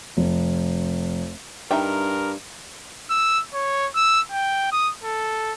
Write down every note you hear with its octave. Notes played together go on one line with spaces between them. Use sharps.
F1
G2 D#4 A#4 E5 G5
E6
C#5
E6
G5
D#6
A4